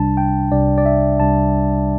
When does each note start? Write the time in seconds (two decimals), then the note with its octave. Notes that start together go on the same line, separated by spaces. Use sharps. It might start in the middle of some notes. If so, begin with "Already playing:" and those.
Already playing: C2 C3 G3 D4 A5
0.17 G5
0.52 C2 C3 G3 D4 D5
0.78 D5
0.86 E5
1.19 C2 C3 G3 D4 A5